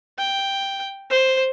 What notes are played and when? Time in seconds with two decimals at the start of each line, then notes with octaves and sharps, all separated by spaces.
0.19 G5
1.10 C5